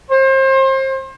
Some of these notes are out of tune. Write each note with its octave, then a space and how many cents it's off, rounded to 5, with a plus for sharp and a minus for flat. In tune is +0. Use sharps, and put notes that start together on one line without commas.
C5 +30